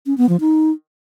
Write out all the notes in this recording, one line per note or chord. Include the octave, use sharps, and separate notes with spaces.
C#4
B3
F3
D#4